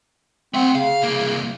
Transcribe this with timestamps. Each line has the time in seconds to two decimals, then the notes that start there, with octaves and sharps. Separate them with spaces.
0.54 A3 C4 F#5
0.75 C#3 F5
1.02 C2 A#3